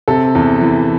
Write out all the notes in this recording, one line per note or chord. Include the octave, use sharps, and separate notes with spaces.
C3 A4
E2
E3